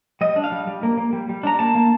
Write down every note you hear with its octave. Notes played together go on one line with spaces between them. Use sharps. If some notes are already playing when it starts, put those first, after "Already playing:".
G3 D#5
D4
F5
G3
G3
A#3
A#3
G3
G3
D4 A#5
A#3 A5
A#3